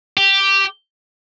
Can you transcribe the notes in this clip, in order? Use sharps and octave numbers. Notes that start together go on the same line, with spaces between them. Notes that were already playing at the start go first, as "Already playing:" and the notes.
G4